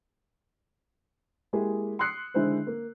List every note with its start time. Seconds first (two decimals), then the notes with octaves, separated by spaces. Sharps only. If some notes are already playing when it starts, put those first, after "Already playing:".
1.53 G#3 A#3 E4 G4 G#4
1.99 C6 D#6 E6 F#6 C7 C#7
2.34 D3 D#3 G#3 E4 C5
2.67 A#3